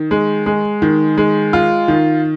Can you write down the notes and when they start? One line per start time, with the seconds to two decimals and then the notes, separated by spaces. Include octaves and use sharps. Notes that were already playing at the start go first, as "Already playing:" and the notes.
Already playing: D#3
0.11 G#3
0.46 G#3
0.82 D#3
1.18 G#3
1.53 F4
1.88 D#3